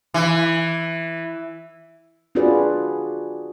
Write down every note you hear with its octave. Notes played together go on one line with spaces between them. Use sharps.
E3
D4 F4 F#4 G#4 B4 D5